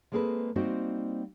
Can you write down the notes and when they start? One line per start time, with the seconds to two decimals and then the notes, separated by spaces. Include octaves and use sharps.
0.12 G#3 A#3 C4 G#4 A4 B4
0.56 G3 A#3 C4 D#4 F#4 C5